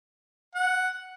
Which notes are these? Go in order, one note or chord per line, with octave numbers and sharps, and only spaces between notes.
F#5